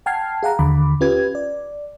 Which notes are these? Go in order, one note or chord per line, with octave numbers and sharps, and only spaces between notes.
F#5 G5 A5 F6 G#6 C7
G#4 F5 F#5 A#5
D#2 D3 B5 D6
C#4 F4 G4 B4 G#6
D5